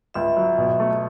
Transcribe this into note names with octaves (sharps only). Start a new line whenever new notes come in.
C#2 E5
F#3
B2
A3